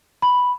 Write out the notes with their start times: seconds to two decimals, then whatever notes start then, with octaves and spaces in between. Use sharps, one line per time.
0.22 B5